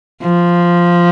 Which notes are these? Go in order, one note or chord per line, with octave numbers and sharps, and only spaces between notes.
F3